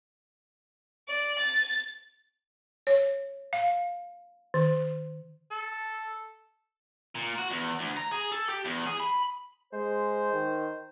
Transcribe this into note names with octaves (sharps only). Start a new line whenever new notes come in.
D5
A6
C#5
F5
D#3
A4
A#2
F#4
E2
D2
A#5
G#4
A4
G4
E2
G#4
B5
G#3 C5
D#3